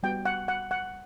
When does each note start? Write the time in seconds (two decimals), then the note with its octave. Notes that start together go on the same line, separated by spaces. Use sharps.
0.03 G3 B3 F#4 G5
0.26 F#5
0.48 F#5
0.71 F#5